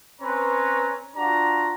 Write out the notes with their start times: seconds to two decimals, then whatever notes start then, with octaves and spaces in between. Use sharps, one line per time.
0.21 C4 C#4 B4 C#5 A#5
1.15 D4 F4 F#4 A#5